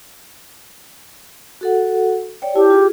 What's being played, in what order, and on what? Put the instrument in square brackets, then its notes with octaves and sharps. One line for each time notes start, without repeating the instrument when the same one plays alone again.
[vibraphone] F#4 A4 F#5
C#5 D5 G5
[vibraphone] E4 A5 [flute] G4
[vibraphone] F4 G#4